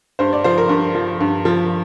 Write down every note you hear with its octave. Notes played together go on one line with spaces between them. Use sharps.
G2 C5
D5
F3 C5
A#4
G2
F3
G2
F3